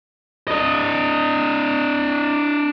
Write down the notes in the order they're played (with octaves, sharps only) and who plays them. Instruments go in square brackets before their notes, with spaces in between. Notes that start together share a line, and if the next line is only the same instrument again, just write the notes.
[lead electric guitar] D4 D#5